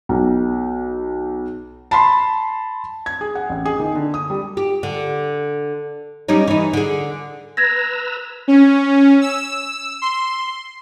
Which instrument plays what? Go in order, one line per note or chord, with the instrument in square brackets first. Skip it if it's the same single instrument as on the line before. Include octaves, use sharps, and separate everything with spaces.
[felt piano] B1
A5 B5 C6
G#6
G#4
F#5
A1
G#4
D#3
D3
D#6
G3
[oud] G4
D3
G3 C#4 D#4
E3 D#4
D3 G#4
[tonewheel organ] B4 A#5 E6 [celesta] G#6 A#6
[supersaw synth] C#4
E6
C6